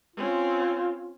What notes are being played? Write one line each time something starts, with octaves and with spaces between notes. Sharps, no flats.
C4 C#4 F4